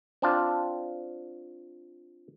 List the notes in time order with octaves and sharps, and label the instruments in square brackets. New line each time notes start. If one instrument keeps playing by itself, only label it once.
[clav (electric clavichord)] C4 D4 F4